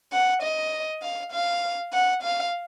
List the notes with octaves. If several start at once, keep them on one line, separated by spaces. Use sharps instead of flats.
F#5
D#5
F5
F5
F#5
F5